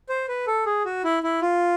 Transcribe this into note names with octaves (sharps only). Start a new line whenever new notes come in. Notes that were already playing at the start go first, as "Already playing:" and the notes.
C5
B4
A4
G#4
F#4
E4
E4
F4